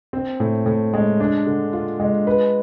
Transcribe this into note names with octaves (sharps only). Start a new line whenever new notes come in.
C4
A2
A2
G#3
D4
D3
F4
G#3
B4